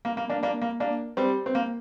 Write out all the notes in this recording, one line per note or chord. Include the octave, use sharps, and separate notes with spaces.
A#3
A#3
A#3 D4
A#3 D4
A#3
A#3 D4
G3 C4
C4
A#3